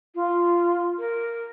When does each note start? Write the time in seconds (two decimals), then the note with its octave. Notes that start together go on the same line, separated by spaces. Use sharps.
0.15 F4
0.98 A#4